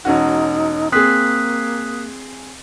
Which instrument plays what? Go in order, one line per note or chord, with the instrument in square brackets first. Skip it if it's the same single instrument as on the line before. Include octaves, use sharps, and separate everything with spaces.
[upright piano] E1 C#4 F#4 [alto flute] D#4
[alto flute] A#3 [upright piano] C4 G#4 [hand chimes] D#6 F#6 B6